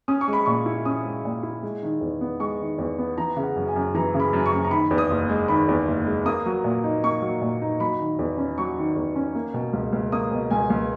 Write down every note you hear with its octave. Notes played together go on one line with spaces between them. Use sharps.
C#4 D#6
C#6
G#3
B5
A#2 C#6
E4
C#4 D#6
G#3
A#2
E4
G#3
D#3
E2
B3
G#3 C#6
D#3
E2
B3
E3 A#5
C#3
F#5
F#2
G#5
F#2
E3 A#5
C#3
B5
F#2
C#6
F#2
A#5
D#3 B5
E2
D#6
F#1
G#3
D#3 B5
E2
F#1
G#3
A#3 D#6
F#3
A#2
D#4
A#3 C#6
F#3
A#2
D#4
F#3 B5
D#3
E2
C#4
F#3 C#6
D#3
E2
C#4
A#3
B2
C#2
C#2
A#3 D#6
B2
C#2 G#5
C#2